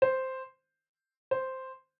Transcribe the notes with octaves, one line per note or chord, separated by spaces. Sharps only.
C5
C5